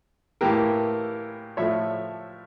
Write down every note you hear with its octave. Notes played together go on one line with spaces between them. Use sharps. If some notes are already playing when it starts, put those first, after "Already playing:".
A2 E3 A#3 G4 A#4
A2 F3 A3 C#5 E5